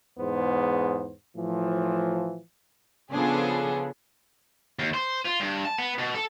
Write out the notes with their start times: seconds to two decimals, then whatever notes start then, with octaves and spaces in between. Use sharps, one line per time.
0.19 E2 G#2 B3 C5
1.36 A2 E3 F3
3.12 C#3 F3 B3 D4 G#4 A4
4.79 D#2
4.94 C5
5.25 F4
5.40 G2
5.65 A5
5.79 B3
5.98 B2
6.14 A4